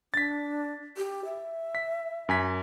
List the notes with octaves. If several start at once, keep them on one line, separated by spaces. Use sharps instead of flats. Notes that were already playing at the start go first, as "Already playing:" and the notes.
D4 A6 B6
G4
E5
B6
F#2 G#5 B6